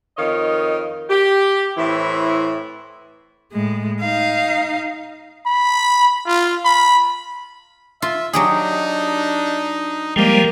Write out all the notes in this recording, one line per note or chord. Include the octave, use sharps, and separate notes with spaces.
F2 D#3 C#5 D#5 F5
G4
A2 E3 C4 E4
A2 G#3
D#4 F5
B5
F4
B5
F4 E5
F#3 D4 D#4 G4 G#4
F3 G3 G#3 A#3 G4 A#4